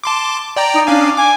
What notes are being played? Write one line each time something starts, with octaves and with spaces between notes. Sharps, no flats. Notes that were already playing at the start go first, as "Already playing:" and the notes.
A5 C6 D6
D5 G5 A#5
D#4
C#4 D4 F5 G#5
G#5 D6